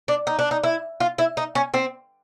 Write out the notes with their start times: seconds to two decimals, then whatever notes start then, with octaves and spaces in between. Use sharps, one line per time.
0.08 D4
0.27 D#4
0.39 D4
0.51 D#4
0.64 E4
1.00 F4
1.18 E4
1.37 D#4
1.55 C#4
1.74 C4